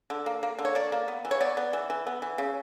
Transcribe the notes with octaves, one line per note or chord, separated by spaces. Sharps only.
D3
A#3
A#3
D3
C#5
A#3 D5
A#3
B3
E3
C#5
B3 D5
B3
E3
E3
B3
E3
C#3